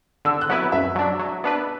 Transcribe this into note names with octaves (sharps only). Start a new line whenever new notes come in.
D3 E6
F#6
F#3 B3 E4 B4
F#2 E5
F#3 D4
F#3
B3 D4 B4